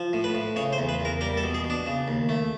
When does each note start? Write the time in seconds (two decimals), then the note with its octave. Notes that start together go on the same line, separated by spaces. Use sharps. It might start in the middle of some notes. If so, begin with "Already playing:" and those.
Already playing: F3
0.13 A2
0.24 B4
0.35 A2
0.56 C#3 C#5
0.73 C5
0.78 E2
0.89 B4
1.00 E2 A#4
1.21 G3 A#4
1.37 A4
1.44 B2
1.54 G#4
1.64 B2
1.70 D4
1.87 C#3
2.08 D#2
2.29 A3